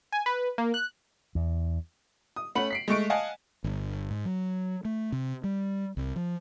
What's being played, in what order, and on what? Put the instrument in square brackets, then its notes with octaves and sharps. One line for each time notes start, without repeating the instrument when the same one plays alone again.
[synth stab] G#5
B4
A#3
F#6
[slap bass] E2
[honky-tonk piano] D#6
A3 C#4 F#5 B5 F#7
B6 C7 D7
G#3 A3 C#6 D7
D#5 F5 F#5 G#5 A5
[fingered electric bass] G1
G#2
F#3
A3
C3
G3
C2
F3